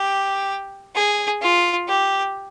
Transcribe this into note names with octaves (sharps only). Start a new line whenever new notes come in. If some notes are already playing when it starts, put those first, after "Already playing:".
Already playing: G4
G#4
F4
G4